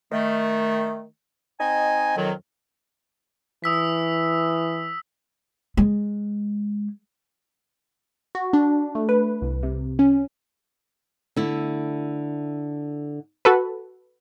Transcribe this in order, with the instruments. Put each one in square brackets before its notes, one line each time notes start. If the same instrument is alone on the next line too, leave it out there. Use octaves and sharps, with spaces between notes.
[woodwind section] D#3 A3
C4 D#4 D#5 G#5
F2 D#3 F#3
[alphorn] E3 [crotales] D#6 E6 B6
[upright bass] G#3
[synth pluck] F#4
D4
A3
B4
C2
C3
C#4
[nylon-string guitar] D3 A3 E4
[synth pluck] F#4 A4 B4